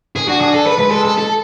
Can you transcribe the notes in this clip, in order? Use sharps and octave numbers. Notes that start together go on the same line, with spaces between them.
G#4
D4 F#4
G#4
A4
B4
G#3 B4
A4
A4
A4